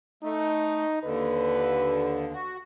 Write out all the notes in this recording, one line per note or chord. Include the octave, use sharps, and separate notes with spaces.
A3 D#4
D#2 D3 B4
F#4